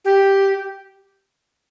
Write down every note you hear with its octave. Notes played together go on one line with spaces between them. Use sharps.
G4